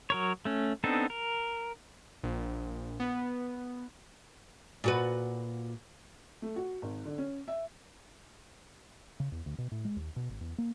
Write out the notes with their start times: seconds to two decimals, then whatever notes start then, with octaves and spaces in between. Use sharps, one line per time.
0.10 F#3 A#4 C#5
0.45 A3 C#4
0.84 B3 C4 D4 D#4 A4
1.10 A#4
2.24 A#1
3.00 B3
4.84 A#2 F#4 B4
6.42 A3
6.56 F#4
6.82 G#1
7.05 D3
7.18 C#4
7.48 E5
9.20 C#3
9.32 E2
9.46 D2
9.58 B2
9.72 A2
9.85 G#3
9.96 D#2
10.16 B2
10.29 G#1
10.41 E2
10.58 A#3